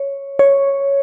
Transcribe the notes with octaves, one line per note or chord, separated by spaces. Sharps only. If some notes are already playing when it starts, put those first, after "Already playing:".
Already playing: C#5
C#5